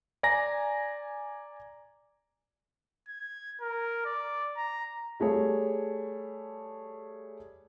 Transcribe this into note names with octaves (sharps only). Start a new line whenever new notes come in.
D5 G#5 A#5 A#6
G#6
A#4
D5
A#5
G3 A3 G#4 C#5